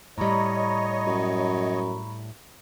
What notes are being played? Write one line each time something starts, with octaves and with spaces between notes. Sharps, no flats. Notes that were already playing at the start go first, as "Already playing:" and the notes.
A2 G3 C#5 D#5 A#5 B5 C#6
F#2